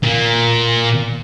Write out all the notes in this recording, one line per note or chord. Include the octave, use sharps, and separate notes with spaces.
A#2 A#3